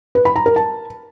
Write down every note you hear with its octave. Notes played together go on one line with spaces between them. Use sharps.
B4
B5
A#5
A#4
A5